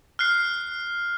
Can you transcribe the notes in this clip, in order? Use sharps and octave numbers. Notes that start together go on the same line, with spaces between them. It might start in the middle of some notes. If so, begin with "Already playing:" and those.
F6 F#6 C7